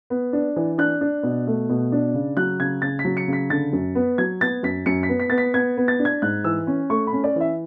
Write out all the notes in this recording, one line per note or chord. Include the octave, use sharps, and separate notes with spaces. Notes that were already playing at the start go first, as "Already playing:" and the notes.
B3
D4
E3
D4 F#6
D4
B2
A3
B2
D4
C#3
F#3 F#6
C#3 G#6
C#3 A6
B6
F#3
C#7
C#3
B6
D3 A6
F#2
B3
F#3 G#6
B3 A6
F#2 B6
F#2 C#7
B6
B3
B6
B3 A6
B6
B3 G#6
B3
A6
D4
G#6
G#2 F#6
E3 E6
C#4
A3 C#6
B5
C#4
D5
E3 E5